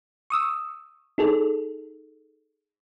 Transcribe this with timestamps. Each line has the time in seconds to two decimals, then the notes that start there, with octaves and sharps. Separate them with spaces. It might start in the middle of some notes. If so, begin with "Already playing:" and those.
0.30 C#6 D#6 E6
1.18 D#4 G#4 A4